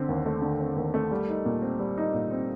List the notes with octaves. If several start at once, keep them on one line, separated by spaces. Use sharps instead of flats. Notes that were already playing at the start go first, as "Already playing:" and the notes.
Already playing: D3 C4
D#2
A3
D3
C4
D#2
A3
G3
D#4
A#2
C4
G3
D#4
A#2
C4